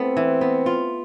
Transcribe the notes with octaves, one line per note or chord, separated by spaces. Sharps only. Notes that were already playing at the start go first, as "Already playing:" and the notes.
Already playing: A3 B3 C4 E4
E3
B3
F4